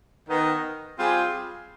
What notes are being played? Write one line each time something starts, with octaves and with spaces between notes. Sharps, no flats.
D#3 B3 D#4
G3 C4 F4 G#4